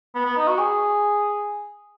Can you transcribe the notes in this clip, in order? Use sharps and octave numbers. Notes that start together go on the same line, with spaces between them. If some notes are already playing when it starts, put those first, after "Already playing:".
B3
B3
D#4
F#4
G#4